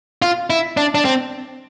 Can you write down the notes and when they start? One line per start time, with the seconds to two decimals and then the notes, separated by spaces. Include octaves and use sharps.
0.22 F4
0.50 E4
0.77 D4
0.95 D4
1.05 C4